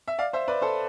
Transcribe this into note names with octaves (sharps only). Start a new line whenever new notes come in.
E5
D5 F5
C5 E5
B4 D5
A4 C5